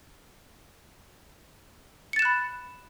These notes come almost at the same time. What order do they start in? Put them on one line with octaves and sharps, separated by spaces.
C#7 A6 E7 F#6 B5